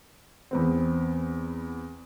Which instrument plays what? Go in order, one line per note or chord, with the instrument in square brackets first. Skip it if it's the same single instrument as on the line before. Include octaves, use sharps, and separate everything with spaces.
[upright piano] E2 B3 C4